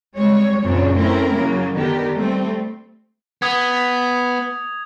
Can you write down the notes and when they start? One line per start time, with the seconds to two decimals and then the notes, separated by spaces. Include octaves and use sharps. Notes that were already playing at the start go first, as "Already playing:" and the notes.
0.16 G3 G#3 C4 C#5
0.63 F#2 A#2 C#3 C4 D4 C#5
0.96 A3 C4 C#4 E4 A#4
1.35 C#3 F#3 A#3
1.75 D3 D#3 B3 D4 G4 A#4
2.17 G3 A3 C4
3.42 B3 D#6 G#6